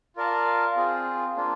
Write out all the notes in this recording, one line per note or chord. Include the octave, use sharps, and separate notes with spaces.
F4 A#4 D5 F5 A5
C4 F4 G#4
A#3 D4 F4